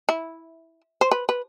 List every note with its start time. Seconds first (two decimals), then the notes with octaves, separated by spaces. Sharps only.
0.09 E4
1.01 C5
1.11 B4
1.29 B4